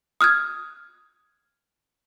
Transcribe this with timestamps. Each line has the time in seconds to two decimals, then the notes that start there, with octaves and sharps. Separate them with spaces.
0.21 D#6 F6 F#6 G#6